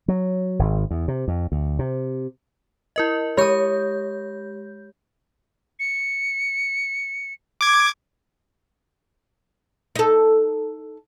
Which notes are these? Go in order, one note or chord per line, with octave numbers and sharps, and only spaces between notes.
F#3
G#1
E2
C3
F2
D2
C3
E4 A#4 D#5
G#3 G4 C#5 D#6 G6
C#7
D6 G#6
D#4 A4